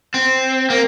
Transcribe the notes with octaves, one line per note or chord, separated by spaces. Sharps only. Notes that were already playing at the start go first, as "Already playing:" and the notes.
C4
A#3